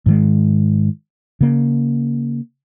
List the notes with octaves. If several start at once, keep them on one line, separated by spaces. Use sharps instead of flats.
G#2 D#3 G#3
C#3 A#3